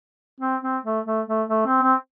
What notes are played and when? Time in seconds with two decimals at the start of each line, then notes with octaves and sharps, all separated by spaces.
0.40 C4
0.62 C4
0.85 A3
1.06 A3
1.27 A3
1.50 A3
1.66 C4
1.83 C4